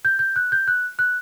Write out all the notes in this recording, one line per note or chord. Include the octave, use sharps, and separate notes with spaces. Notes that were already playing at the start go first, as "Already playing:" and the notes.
G6
G6
F#6
G6
F#6
F#6